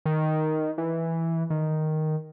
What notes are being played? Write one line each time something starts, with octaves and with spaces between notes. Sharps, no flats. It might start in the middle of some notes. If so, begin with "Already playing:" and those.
D#3
E3
D#3